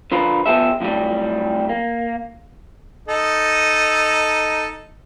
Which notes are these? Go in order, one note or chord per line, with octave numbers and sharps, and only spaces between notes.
D3 F3 F4 A#4 B4
F3 B3 G4 A4 E5
F2 A2 F#3 G3
A#3
D#4 A4 D#5